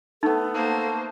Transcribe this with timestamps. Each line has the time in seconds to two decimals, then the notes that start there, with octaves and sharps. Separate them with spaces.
0.23 A3 B3 D#4 A4
0.54 A#3 C5 A5